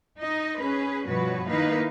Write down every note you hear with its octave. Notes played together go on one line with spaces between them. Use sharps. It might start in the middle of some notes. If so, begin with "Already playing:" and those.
D#4 D#5
C#4 G#4 B4
G2 B2 F3 F#4 B4 C#5
D#3 A#3 D#4 E4 B4 F5